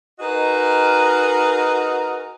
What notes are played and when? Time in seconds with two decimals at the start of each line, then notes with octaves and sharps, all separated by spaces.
0.20 D#4 F#4 G#4 A#4 B4 D#5